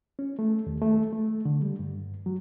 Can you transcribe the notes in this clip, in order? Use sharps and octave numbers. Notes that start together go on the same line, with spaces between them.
C#4
A3
D#2
A3
A3
D3
G3
G2
F#3